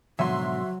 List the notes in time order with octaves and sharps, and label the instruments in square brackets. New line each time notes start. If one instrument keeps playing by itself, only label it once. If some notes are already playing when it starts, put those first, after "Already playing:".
[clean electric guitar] G#2 B2 D3 [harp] F#3 [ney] F#4 [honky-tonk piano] E5 C6